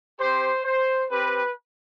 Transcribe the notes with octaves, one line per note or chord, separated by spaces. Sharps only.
C4 G4 C5
C5
C4 G4 B4